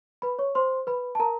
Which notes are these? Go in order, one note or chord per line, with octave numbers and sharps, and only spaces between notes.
B4 B5
C#5 C#6
C5 C6
B4 B5
A5
A#4 A#5